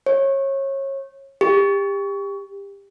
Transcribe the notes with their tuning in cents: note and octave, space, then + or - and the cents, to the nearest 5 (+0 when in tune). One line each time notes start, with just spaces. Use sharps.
C#5 -25
G4 +25